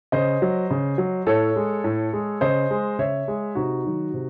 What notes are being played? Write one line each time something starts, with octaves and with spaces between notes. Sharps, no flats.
C#3 C5 D#5
F#3
C#3
F#3
A2 A4 C#5
G#3
A2
G#3
C#3 C5 D#5
G#3
C#3 C#5 E5
G#3
C3 D#4 F#4
D#3 F#3
C3